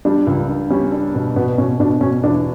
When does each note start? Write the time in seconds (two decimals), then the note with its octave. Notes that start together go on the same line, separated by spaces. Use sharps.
0.05 G3 D4
0.27 C#2
0.48 D4
0.70 G3 C#4
0.92 D4
1.15 B2
1.36 B2 B3
1.58 B2 C#4
1.80 B2 D4
2.01 B2 C#4
2.23 E2 D4